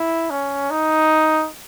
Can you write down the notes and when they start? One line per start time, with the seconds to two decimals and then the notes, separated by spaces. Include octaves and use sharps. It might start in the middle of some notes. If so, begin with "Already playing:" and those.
Already playing: E4
0.30 C#4
0.71 D#4